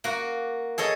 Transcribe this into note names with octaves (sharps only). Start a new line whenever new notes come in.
A#3 F#4
G#4 A4 C#5 D#5